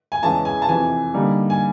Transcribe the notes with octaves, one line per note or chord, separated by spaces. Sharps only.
G#5
E2 C#3 E3 G#3 A5
G#5
A5
F2 C3 E3 G#5
D3 G3 A#3 D#4
G#5